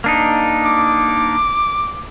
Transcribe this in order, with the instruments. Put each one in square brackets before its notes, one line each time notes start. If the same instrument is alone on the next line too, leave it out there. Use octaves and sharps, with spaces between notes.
[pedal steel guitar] A#3 D4 D#4
[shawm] D6